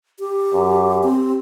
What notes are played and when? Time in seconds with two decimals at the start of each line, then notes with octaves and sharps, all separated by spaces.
0.19 G4
0.53 F#2
1.03 C4 G4